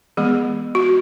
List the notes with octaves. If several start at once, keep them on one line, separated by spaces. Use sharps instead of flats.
E3 G#3 B3 G#4
F#4